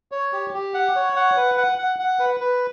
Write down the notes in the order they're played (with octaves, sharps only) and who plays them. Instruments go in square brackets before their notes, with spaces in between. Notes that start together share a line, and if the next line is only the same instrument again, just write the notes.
[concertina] C#5
G4
G4
F#5
C#5
F#5
B4
F#5
F#5
F#5
B4
B4